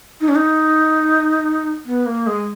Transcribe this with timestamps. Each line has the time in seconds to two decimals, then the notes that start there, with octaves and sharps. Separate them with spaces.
0.21 D#4
0.29 C#4
0.35 D#4
1.86 B3
2.06 A#3
2.27 G#3